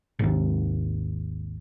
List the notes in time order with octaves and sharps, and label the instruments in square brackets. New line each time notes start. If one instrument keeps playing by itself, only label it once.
[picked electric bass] G#1 D#2